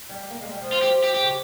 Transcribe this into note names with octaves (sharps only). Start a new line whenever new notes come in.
G3
A#3
G#3
G3
F3
F4
G4
G4
E3 G4
C#3